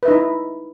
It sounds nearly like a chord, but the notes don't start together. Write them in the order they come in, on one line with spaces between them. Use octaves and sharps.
B4 E5 D#4 E4